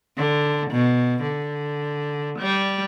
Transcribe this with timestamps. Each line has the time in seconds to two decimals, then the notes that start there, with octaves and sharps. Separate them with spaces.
0.17 D3
0.71 B2
1.23 D3
2.39 G3